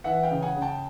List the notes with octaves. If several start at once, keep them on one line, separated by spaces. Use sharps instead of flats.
E3 E5 F#5
F5 G5
C#3
F#5 G#5
C#3
G5 A5